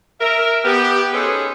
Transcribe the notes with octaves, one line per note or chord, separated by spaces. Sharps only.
A#4 E5
B3 G4
C#4 D#4 G#4 A4 B4 C5